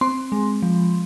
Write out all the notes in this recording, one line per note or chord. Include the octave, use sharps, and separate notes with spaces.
C4 C6
G#3
F3